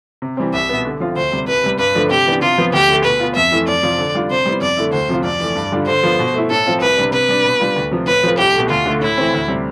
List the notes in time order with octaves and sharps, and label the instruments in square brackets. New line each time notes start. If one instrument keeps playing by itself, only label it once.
[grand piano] C3
E3 G3 C4
[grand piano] C2 [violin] E5
[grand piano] B2 B3
D3
F3 C4 F4
[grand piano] D2 [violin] C5
[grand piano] C3 G3
[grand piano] C2 [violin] B4
[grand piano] C3 G3
[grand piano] G2 [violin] B4
[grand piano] D3 F3 A3 D4
[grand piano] C3 [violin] G4
[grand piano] E3 B3 D4
[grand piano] C3 [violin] F4
[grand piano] F3 B3
[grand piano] D2 [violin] G4
[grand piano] D3 A3
[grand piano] B2 [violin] B4
[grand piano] B3 F4
[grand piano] F2 [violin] E5
[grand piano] E3 A3 E4
[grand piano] F2 [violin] D5
[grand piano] C3 F3 C4 F4
D3
G3 D4 F4
[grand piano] C3 [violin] C5
[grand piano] G3 B3 E4
[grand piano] F2 [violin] D5
[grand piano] D3 A3 E4
[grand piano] D2 [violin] C5
[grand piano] C3 F3 C4 F4
[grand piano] F2 [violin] D5
[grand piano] E3 A3
G2
D3 G3 D4 F4
[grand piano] D3 [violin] C5
[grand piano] F3 B3 F4
B2
A3 E4
[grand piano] A2 [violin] A4
[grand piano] F3 C4 F4
[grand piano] C2 [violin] B4
[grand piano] C3 G3 D4
[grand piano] C3 [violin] B4
[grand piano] G3 D4
B2
G3 D4 F4
D2
C3 F3
[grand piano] A2 [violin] B4
[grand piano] F3 A3 C4 F4
[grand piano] C2 [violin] G4
[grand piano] B2 A3
[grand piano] D2 [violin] F4
[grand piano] D3 A3
[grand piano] A2 [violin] E4
[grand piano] E3 A3 C4
D2
C3 G3 C4